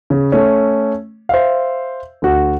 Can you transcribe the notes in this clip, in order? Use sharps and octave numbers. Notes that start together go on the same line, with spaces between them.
C#3
A3 C#4
C5 E5 F5
D2 F#4